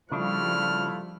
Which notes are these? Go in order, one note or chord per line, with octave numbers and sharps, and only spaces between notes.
C#3 F3 G3 A3 D4 E4 F4 F6